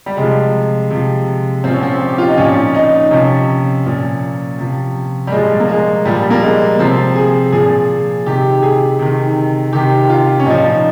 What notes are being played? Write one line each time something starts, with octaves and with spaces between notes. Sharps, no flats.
G3
C3 F3 G#3
C3 F3
A#2 F3 C4
C#4
C4
G4
F4
D#4
A#2 F3 C#4
D#4
C3 F3 C#4
A#2 F3
C3 F3
G3
A#2 F3 G#3
A#3
G#3
A#2 F3 G3
A#3
G#3
C3 F3 C4
G#4
A#2 F3 G#4
C3 D#3 G4
G#4
C3 D#3
C3 D#3 G4
F4
C#4
A#2 F3 D#4